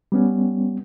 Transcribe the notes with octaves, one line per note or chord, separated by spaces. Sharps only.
G3 B3 C#4